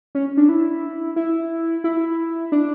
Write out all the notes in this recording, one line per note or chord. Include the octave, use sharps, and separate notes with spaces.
C#4
D4
E4
E4
E4
D4